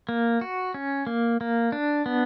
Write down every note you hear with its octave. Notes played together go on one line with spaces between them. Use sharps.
A#3
F#4
C#4
A#3
A#3
D4
B3